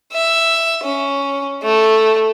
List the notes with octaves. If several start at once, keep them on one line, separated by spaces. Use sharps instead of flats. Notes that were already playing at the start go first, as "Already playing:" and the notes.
E5
C#4
A3